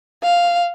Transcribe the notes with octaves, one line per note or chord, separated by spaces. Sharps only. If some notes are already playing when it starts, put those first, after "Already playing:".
F5